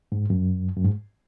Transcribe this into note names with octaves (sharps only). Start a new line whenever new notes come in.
G#2
F#2
F#2
G#2